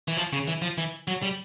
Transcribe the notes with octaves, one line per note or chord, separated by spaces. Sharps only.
E3
F3
C#3
E3
F3
E3
F#3
G3